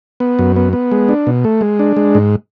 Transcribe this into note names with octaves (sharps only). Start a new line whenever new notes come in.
B3
F#2
B3
B3
G#3
D4
B2
A3
G#3
D4
G#3
G#2